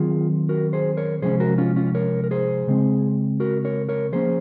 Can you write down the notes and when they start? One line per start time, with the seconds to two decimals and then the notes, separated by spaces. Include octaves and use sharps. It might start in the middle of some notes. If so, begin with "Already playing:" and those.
Already playing: D#3 F#3 C4 F4 G#4
0.49 F#4 A#4
0.73 G#4 C5
0.97 A#4 C#5
1.22 C3 F3 G#3 C#4 G#4 C5
1.40 F#4 A#4
1.58 C#4 F4
1.76 C#4 F4
1.95 A#4 C#5
2.24 A#4
2.31 G#4 C5
2.67 C#3 G#3 C4
3.40 F#4 A#4
3.65 A#4 C#5
3.89 A#4 C#5
4.12 F3 A#3 C#4 G#4 C5